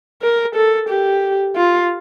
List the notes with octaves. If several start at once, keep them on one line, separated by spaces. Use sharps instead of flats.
A#4
A4
G4
F4